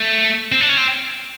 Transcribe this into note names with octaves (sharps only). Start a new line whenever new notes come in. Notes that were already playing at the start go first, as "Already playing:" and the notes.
Already playing: A3
C4
D4
C#4
C4